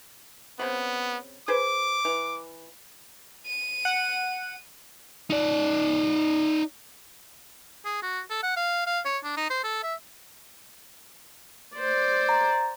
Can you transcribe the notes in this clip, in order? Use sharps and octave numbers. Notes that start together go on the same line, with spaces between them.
C#3 B3 C4 B5
G#4 B4 C5 D6
E3
D#7
F#5
D#4 D5
G#4
F#4
A4
F#5
F5
F5
C#5
D4
D#4
C5
A4
E5
C5 D5
A#5